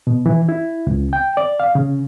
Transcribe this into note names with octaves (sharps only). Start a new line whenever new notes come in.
B2
E3
E4
C#2
G5
D5
F5
C#3